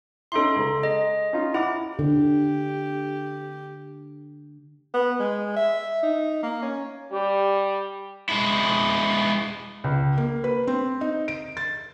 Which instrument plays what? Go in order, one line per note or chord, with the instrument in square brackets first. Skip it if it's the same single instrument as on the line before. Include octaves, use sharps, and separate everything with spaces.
[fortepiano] C#4 D#4 E4 [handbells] A4 C6
[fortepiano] C#2 A#5
[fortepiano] G#3 [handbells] D#5
[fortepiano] C#4 D#4 F4
[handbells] E4 [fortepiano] F#5 D6
[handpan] D3 [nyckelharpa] G4
[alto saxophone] B3
G#3
E5
D#4
A#3
C#4
[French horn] G3 [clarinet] G4
[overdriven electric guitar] G#3 E4
[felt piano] C#2
A#3
B4
C4
D#4
D7
A6